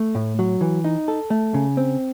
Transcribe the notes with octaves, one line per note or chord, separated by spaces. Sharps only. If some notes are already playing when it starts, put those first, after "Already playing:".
Already playing: A3
A2
F#3
E3
D#4
A4
A3
C#3
C4